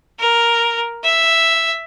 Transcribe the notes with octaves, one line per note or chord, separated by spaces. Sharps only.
A#4
E5